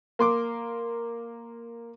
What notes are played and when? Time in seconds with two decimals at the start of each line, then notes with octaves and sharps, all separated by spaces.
0.19 A#3 C6 D6